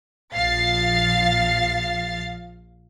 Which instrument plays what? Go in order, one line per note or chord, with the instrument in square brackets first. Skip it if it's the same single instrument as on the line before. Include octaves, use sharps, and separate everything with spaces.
[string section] A#1 F3 F5 A6 C7